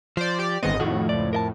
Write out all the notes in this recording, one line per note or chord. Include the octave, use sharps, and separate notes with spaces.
F3 C5 D5
G4 D5
G#1 D#3 B3 C4 D#5
F2 A2 D#3 F4 F#4
C#2 D5
A#4 D#5 A5